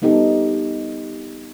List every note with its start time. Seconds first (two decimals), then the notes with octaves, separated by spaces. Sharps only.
0.02 G3 B3 D#4 G4 A4